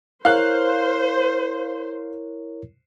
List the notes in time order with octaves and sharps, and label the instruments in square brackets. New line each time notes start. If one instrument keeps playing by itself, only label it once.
[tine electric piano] E4 A#4 C#5 [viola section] C5 [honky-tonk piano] F5 F#6